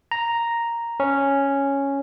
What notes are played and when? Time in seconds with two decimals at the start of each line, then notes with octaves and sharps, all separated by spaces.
0.11 A#5
1.00 C#4